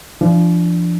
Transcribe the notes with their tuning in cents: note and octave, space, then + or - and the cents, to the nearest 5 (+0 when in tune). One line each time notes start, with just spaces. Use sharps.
F3 -30 D4 +0